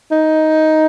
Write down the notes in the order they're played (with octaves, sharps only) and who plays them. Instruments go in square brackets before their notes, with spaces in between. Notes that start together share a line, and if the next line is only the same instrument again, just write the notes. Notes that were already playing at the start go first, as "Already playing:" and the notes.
[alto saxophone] D#4